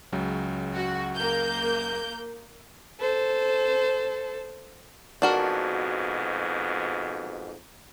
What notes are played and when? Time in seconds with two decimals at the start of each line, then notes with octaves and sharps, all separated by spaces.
0.12 C#2 C#3 F#3
0.74 F#4
1.15 A#3 G6
3.00 A4 C5
5.22 F2 G#2 B2 D4 F#4 A#4